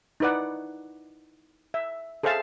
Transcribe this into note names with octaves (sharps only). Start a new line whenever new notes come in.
D#4 E4 B4 D5 F#5
E5
G#4 A4 C5 E5 F5 A5